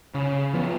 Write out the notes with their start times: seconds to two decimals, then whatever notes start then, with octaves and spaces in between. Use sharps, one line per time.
0.14 C#3
0.53 F3 B3